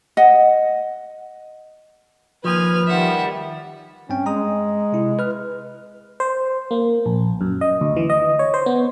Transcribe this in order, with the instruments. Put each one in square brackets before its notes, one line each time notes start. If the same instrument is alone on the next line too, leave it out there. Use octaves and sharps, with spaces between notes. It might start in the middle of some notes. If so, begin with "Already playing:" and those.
[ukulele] D#5 F#5
[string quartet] D#2 B4 F6 [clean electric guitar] F3 [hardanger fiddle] G#5
[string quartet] D#3 G3 [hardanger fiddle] E5 F#5
[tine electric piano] G2 C4 G5 [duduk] C#4
[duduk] G#3 [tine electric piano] A#5 D#6
[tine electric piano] C3 E4
B4 F6
[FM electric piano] C5
A#3
A#1
F#2
D#5
D2
E3
D#5
C#5
C5
B3